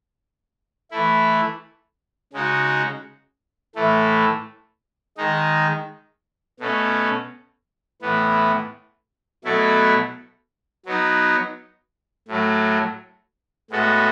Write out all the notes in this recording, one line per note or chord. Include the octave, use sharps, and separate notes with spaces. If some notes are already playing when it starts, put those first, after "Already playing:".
E3 A3 E4
C#3 G#3 D#4 F#4
A2 E3 A3
D#3 G#3 D#4
B2 A3 C#4
A2 E3 B3
B2 F#3 A3 E4 A4
F#3 B3 D#4
A2 F#3 A3
A2 G#3 B3 F#4 A4